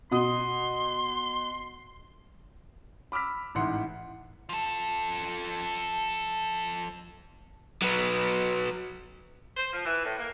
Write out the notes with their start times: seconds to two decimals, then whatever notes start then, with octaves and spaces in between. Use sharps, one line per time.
0.11 B2 C6 D#6
3.12 B5 D6 E6 F6 B6
3.55 A1 G#2 E4 F#5 C6 C#7
4.49 F3 A4
7.82 F#3 B3
9.57 C5
9.73 F3
9.86 E3
10.05 A2
10.18 A#3